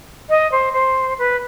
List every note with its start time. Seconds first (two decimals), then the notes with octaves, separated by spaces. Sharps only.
0.30 D#5
0.52 C5
0.73 C5
1.19 B4